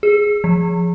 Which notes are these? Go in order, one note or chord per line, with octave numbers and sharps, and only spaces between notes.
G#4
F3